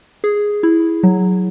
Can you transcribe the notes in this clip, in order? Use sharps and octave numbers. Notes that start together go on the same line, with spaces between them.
G#4
E4
F#3